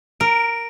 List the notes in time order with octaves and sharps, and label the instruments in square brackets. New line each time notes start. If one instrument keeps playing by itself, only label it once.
[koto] A#4 [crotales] D7